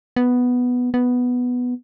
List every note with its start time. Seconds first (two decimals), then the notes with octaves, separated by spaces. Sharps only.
0.16 B3
0.94 B3